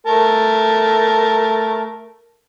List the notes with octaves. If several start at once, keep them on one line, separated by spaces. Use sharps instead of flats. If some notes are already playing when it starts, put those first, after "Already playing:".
A3 A#4 A5